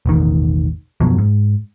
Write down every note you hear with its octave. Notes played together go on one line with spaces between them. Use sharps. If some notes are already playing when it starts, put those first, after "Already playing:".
E1 A1 D#3
F#2 B2 F3 F#3
G#2